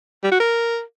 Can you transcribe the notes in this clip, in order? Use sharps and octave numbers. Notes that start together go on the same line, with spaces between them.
G3
F#4
A#4